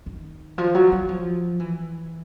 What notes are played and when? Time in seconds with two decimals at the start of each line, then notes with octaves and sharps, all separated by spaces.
0.06 D#3
0.58 F3
0.74 F#3
0.92 F#3
1.09 F3
1.60 E3